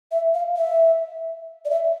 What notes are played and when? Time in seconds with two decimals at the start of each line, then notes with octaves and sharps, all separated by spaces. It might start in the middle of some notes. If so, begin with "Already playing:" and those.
0.11 E5
0.34 F5
0.57 E5
1.65 D5
1.70 E5